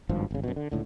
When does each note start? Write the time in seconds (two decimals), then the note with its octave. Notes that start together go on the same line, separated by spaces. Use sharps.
0.09 G#1 G2 F3
0.31 G#1 C#3
0.44 F#2 B2
0.56 D3
0.72 C#2 A2 D3